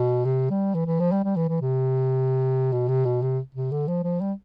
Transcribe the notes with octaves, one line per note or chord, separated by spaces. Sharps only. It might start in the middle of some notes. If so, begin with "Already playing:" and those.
Already playing: B2
C3
G3
E3
E3
F3
G3
G3
E3
E3
C3
B2
C3
B2
C3
C3
D3
F3
F3
G3